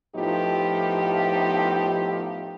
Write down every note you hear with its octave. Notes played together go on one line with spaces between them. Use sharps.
A2 F3 B3 D#4 F4 G4